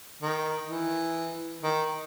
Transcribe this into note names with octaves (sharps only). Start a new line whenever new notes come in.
D#3
E3
D#3